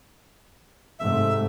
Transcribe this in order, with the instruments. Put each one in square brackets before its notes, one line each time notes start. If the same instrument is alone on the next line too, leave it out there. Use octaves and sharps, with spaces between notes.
[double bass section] G#2 C3 A3 [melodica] E5